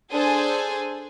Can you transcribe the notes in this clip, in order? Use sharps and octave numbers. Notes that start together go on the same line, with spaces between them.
D4 G#4 A4 C5 G#5